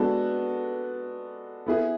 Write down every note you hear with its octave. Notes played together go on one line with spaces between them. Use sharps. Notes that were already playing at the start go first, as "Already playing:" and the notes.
Already playing: G#3 B3 D4 F#4 A4
B3 E4 G#4